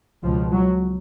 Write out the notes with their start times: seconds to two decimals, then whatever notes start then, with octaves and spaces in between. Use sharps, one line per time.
0.23 C#2 B2 F3
0.52 F#3